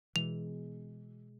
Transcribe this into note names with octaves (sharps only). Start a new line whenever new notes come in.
B2 E3 G#3 F7